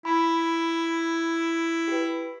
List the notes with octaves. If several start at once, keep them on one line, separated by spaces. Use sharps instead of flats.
E4 B5
G4 B4